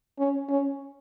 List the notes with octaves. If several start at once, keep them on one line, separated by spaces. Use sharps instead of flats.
C#4
C#4